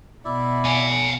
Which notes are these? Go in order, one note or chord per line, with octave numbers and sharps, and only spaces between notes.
B2 E4 D5 E5
F5 G#5